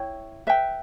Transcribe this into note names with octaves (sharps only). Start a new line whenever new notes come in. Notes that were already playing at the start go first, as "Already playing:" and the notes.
Already playing: E4 C#5 G5
B4 E5 G5